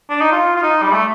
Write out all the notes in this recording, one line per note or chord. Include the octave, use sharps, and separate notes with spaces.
D4
D#4
F4
F4
D#4
G3
A3